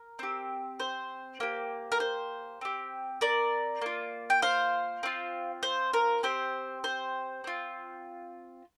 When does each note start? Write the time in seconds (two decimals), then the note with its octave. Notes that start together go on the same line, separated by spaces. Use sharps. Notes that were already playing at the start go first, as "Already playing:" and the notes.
Already playing: A#4
0.19 C4 G4
0.80 C5
1.40 A#3 G4
1.92 A#4
2.00 C5
2.61 C4 G4
3.21 A#4 D5
3.81 A#3 F4
4.30 G5
4.42 C5 F5
5.03 C4 F4
5.63 C5
5.93 A#4
6.23 C4 G4 C5
6.84 C5
7.44 C4 F4